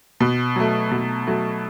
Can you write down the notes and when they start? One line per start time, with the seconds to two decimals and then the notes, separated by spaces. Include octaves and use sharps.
0.20 B2
0.56 F#3 A3
0.91 B2
1.27 F#3 A3